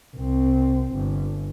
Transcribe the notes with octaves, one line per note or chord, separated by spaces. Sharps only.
C2 C4
G1